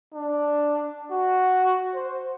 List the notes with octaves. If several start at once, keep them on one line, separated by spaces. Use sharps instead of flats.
D4
F#4
C5